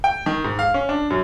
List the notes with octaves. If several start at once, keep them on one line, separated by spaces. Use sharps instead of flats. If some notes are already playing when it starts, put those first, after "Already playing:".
G5
D#3
G#2
F5
C#4
D4
F#2